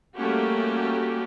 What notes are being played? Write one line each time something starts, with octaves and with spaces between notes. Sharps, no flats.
G3 A3 A#3 C#4 F#4 G4